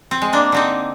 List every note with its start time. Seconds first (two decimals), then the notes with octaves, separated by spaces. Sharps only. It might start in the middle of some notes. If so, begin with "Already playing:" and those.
0.11 C4
0.22 G#3
0.33 A#3 D4
0.52 D3 C4 D#4